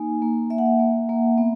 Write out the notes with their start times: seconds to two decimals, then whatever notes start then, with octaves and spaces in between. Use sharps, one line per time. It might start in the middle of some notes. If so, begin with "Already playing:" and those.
Already playing: A#3 D#4 G#5
0.22 A#3
0.50 A#3 E5
0.58 F#5
0.65 E5
0.80 A#3
1.09 A#3
1.38 B3